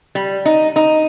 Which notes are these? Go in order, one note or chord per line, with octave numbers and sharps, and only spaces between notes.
G3
D#4
D#4